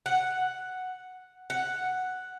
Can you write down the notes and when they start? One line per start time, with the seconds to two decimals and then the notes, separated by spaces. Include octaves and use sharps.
0.06 F#5
1.50 F#5